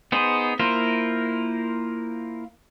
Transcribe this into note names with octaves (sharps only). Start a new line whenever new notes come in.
B3 D#4 G#4 C5
A#3 E4 F4 A#4 C5